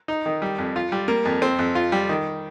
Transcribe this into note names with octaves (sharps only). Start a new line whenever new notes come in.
D#4
D#3
G3
F2
F4
G3
A#3
F2
C4
F2
F4
G3
D#3